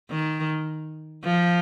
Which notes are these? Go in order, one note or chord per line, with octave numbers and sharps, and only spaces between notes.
D#3
F3